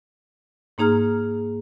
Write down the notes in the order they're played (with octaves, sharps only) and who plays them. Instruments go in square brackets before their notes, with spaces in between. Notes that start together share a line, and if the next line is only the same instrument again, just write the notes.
[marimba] G#2 A#3 D#4 G#4 A#5 F6